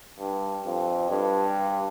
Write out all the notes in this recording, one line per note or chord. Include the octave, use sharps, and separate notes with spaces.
G2
F2
G2